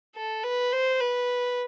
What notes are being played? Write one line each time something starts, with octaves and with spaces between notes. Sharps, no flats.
A4
B4
C5
B4